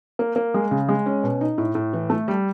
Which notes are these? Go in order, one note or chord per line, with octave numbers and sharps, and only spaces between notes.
A#3
A#3
G#3
C#3
G#3
C#4
B2
D#4
A2
A2
E3
A3
G3